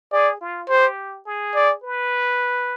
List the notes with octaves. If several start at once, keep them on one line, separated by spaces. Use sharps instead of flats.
G#4 D5
F4
G4 C5
G#4
D5
B4